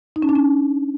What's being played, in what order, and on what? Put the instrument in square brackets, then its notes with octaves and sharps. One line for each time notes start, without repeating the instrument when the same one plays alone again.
[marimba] D#4
C#4
D4
C#4